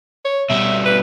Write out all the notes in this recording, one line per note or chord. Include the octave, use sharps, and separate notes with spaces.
C#5
B2 G3 E5
B4